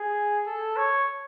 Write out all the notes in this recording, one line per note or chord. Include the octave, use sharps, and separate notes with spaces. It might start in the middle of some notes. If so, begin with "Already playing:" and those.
Already playing: G#4
A4
C#5